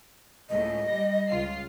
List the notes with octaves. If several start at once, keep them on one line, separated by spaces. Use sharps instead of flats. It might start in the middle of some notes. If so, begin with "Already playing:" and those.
C#2 A2 D#5
G3 A#6
C#2 F4 C7